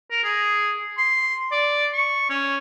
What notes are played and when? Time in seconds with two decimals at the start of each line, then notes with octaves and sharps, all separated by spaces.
0.11 A#4
0.24 G#4
0.98 C6
1.52 D5
1.93 C#6
2.30 C#4